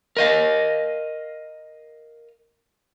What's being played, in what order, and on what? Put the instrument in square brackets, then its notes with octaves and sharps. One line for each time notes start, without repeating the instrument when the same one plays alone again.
[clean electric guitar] A#4 D#5 F5